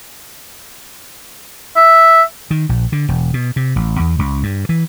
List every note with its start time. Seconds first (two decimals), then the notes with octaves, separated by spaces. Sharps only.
1.76 E5
2.51 D#3
2.69 A#1
2.92 D3
3.09 E1
3.34 B2
3.56 C3
3.76 A1
4.00 E2
4.19 C#2
4.43 G2
4.69 E3